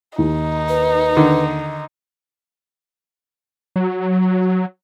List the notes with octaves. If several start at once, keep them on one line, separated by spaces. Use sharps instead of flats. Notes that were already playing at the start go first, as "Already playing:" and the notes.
D#2 D#4
B4
D3 D#3
F#3